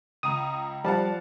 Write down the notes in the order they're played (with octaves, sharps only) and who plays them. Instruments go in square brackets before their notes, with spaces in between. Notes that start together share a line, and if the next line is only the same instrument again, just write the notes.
[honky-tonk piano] C#2 A#5 [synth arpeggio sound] D#6
[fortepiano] F3 A5 [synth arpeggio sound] G3 [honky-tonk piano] D5 F5 F#5